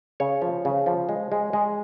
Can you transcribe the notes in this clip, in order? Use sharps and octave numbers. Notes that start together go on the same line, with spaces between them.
C#3 C#5
F3
C#3
F3
G#3
G#3
G#3